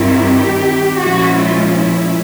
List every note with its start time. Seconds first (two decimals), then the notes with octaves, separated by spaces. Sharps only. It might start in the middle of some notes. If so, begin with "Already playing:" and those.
Already playing: G2 D#3 G3 C4 E4 F4
0.22 G4
0.98 A#2 F3 G#3 C#4 E4 F#4
1.36 F4
1.74 E4